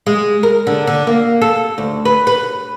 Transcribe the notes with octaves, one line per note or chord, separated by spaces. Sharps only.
G#3
A#4
D3
D3
A#3
A4
D2
B4
B4